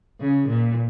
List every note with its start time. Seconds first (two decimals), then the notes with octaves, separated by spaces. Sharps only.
0.20 C#3
0.49 A#2